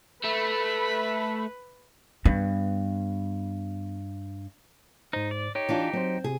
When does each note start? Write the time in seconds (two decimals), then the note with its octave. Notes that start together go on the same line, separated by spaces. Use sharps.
0.24 A3 B4 B5
2.25 G2 B3
5.13 G#2 D#4 C5
5.31 D5
5.55 D#4 G4 C#5
5.69 E3 D4 F4
5.94 F#3 C4 C5
6.24 C3 G#4